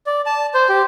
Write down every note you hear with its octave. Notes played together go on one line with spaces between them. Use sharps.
D5
A5
C5
G4